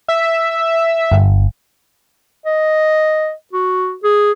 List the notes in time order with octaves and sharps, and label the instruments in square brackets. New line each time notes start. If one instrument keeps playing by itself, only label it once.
[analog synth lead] E5
[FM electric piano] G1
[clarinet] D#5
F#4
G#4